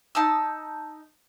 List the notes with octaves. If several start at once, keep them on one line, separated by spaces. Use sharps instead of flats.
D#4 A5 D#6 E6